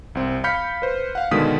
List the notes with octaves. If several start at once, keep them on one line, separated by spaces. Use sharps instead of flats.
C2 C4
F5 B5 F6 G6 B6 C#7
B4 C5
F5 F#5
B2 D3 D#3 G#3 D#6 B6